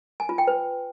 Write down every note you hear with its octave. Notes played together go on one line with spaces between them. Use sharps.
G#5
F4
G5
B4